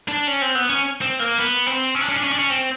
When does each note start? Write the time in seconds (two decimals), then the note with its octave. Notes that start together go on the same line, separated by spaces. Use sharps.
0.08 D4
0.27 C#4
0.42 C4
0.55 B3
0.69 C#4
1.02 C4
1.20 A#3
1.39 B3
1.67 C4
1.95 C#4
2.01 D4
2.09 C#4
2.16 D4
2.24 C#4
2.31 D4
2.39 C#4
2.50 C4